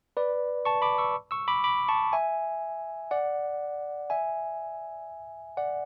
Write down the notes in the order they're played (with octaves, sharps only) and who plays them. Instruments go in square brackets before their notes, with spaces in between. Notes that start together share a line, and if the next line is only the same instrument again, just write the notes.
[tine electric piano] B4 D5
A5 C#6
B5 D6
C#6 E6
C#6 E6
B5 D6
B5 D6
A5 C#6
E5 G#5
D5 F#5
E5 G#5
D5 F#5